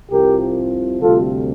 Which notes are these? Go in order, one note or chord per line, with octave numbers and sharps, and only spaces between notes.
C2 C3 F3 G4 A#4
D2 C3 G3 F4 A4